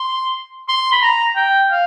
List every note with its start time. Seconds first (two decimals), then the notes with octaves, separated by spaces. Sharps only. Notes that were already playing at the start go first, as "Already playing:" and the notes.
Already playing: C6
0.68 C6
0.92 B5
1.02 A#5
1.36 G5
1.71 F5